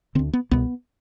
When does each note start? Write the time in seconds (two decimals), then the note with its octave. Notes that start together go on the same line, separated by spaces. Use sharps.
0.15 D3 C4
0.19 D2
0.33 B3
0.51 C2 B2 B3